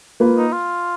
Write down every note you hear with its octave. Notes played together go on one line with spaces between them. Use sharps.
A#3 F4 B4
D#4
F4